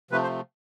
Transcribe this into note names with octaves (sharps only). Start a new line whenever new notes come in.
C3 F3 A3 B4
C5